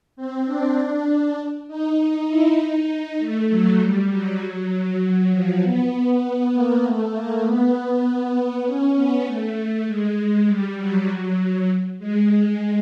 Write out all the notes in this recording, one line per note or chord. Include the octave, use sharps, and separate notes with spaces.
C4
D4
D#4
E4
D#4
A3
F#3
G3
F#3
F#3
F3
B3
B3
A#3
A3
A#3
B3
C#4
B3
A3
G#3
G3
F#3
G#3